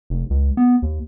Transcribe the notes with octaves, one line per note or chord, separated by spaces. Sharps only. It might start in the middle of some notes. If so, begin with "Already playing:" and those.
F1
C#2
B3
D#2